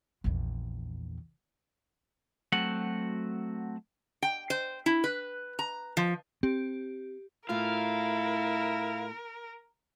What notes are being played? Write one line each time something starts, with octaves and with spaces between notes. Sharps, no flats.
A#1 E2
F#3 A3 C4 F#4 F#5
G5
C5
E4
B4
A#5
F3
C4 G4
A2 A3 E4 F4 A#4 F5